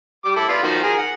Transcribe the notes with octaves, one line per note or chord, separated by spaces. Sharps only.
G3 D6
E4 A4
B3 F4 D5
D#3 F3 F#4
G#4 A#4
F#5